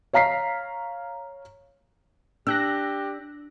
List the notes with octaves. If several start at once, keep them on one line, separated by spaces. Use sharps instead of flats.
C#5 F5 A#5 B6 C7
D4 G4 E6 F#6 A#6